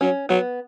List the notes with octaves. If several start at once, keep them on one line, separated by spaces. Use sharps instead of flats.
F#3 C#4
F#3 B3